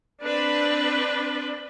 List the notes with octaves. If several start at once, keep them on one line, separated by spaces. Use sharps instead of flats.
C4 D4 B4